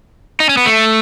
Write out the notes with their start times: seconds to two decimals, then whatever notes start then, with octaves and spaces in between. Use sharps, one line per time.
0.40 D#4
0.49 C#4
0.57 B3
0.66 A3